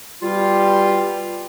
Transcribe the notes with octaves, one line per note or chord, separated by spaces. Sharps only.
B2 G3 F4